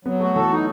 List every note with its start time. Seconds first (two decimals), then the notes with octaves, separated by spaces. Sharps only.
0.05 F#3 B3
0.20 A3 F#4
0.35 E3 A4
0.50 D#4